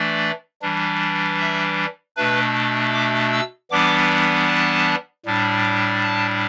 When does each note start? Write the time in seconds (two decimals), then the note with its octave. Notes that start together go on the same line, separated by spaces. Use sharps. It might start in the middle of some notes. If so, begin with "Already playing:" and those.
Already playing: E3 A3 D4 D5
0.62 E3 G3 D4
1.40 E5
2.16 B2 A3 D4 B4
2.94 D6
3.33 E6
3.71 E3 G3 B3 D4 D6
4.48 A5
5.26 A2 G3 D4
6.03 A5